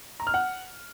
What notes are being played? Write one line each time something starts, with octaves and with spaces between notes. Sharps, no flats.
A#5
F6
F#5